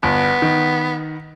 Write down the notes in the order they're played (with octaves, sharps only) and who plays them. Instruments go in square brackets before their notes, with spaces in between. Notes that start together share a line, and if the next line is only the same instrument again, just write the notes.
[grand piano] G1 [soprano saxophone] B3
[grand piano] D#3